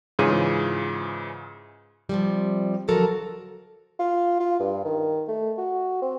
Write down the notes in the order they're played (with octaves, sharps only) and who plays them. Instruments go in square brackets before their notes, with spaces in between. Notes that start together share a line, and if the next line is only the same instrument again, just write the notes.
[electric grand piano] G#2 C#3 E3 F4 G#4 D#7
[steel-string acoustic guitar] C3 F3 G3
D3 F3 F#3 F#4 A4 A#4
[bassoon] F4
F4
G2
D#3
A3
F#4
C4